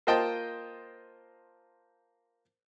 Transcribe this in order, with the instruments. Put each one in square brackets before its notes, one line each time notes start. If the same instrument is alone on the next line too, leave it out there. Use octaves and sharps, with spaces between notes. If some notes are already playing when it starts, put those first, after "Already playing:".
[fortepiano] A#3 F4 C5 D#5 G5 A5